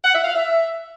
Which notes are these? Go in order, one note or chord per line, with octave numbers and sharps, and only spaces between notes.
F#5
E5
F5
E5